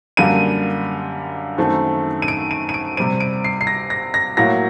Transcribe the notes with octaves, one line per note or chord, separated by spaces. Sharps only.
F#2 D3 G3 A#3 D#7
F#2 D#3 A3 C4
D#7
D7
D#7
D#7
D7
C3 G3 C4 D#7
D7
C7
C7
A#6
A#6
A#6
A2 F#3 A#3 A#6